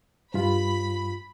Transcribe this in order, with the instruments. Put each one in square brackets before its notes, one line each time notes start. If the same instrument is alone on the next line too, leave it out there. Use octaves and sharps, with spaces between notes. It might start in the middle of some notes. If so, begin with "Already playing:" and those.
[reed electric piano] G2 F4 [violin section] B5